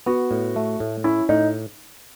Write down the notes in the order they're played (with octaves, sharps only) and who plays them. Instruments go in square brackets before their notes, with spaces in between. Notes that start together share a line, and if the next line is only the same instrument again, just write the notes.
[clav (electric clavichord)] B3 [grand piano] F#4
[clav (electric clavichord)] A2
A3
A2
[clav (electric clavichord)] C#4 [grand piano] E4
[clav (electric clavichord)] A2 [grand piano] D#4